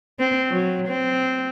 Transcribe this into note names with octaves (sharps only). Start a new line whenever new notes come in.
C4
F#3
C4